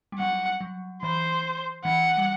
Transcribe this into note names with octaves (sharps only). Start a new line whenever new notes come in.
G3
F#3 F#5
F#3
E3 C5
E3 F#5
G3